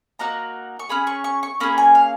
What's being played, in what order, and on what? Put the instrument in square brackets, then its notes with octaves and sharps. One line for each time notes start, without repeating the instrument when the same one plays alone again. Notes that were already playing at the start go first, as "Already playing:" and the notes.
[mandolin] A#3 D#4 F#4 A#5
C#6
C#4 G#4 B5
C#6
C#6
C#6
A#3 C#4 G#4 B5
G#5
F5